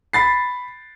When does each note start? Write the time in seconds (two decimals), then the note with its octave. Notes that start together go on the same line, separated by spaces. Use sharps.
0.13 B5 A6 C7